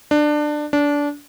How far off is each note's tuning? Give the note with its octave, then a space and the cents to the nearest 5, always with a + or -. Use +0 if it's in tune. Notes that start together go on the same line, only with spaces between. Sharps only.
D4 +20
D4 -20